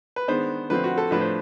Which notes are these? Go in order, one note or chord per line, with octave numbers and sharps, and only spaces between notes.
B4
D#3 G#3 B3 D4 C5
D3 F3 A3 C4 B4
F#4
A4
A2 F3 A3 D4 B4
C5